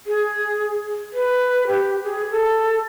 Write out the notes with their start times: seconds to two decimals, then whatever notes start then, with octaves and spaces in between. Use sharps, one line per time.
0.07 G#4
1.13 B4
1.67 G4
2.03 G#4
2.31 A4